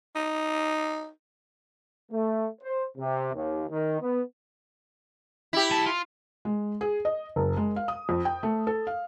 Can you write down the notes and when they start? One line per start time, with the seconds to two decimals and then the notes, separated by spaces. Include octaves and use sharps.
0.15 D#4
2.11 A3
2.62 C5
2.98 C3
3.34 D#2
3.70 D#3
4.00 B3
5.53 E4 G4
5.71 C2 A5
5.86 F4
6.45 G#3
6.81 G#4
7.05 D#5
7.36 F#1
7.57 G#3
7.76 F5
7.88 D#6
8.09 F2
8.25 G5
8.43 A3
8.67 A4
8.87 F5